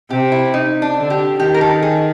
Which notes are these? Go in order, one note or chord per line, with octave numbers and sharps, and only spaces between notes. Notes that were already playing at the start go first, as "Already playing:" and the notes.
C3 G4
E4
D#4
D4
D3
G4
D#3 G4
A#4
A4
G#4